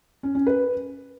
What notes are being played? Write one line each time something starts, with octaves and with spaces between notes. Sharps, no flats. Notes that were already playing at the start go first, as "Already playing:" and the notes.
C#4
C#4
B4